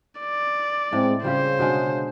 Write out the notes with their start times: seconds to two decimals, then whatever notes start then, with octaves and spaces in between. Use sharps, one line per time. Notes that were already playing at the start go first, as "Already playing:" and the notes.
0.20 D5
0.93 A2 G#3 C4
1.25 C#3 G3 F4 G4 C5
1.59 B2 D3 G#3